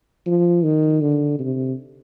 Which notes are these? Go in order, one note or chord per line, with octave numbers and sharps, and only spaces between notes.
F3
D#3
D3
C3